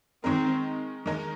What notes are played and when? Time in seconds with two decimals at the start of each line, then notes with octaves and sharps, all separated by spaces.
0.24 D#3 G#3 C4 D#4 A#4
1.06 D#3 G#3 D#4 A#4